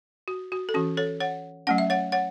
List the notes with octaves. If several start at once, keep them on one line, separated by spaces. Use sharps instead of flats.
F#4
F#4
A4
E3 C#4 F#4
A4 C#5
C#5 F#5
F#3 A3 C#4 F#5
E5
C#5 F#5
C#5 F#5